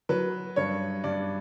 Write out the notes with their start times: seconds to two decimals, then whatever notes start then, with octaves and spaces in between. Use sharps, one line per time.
0.09 F#3 B4
0.56 G2 C#5
1.04 G2 D5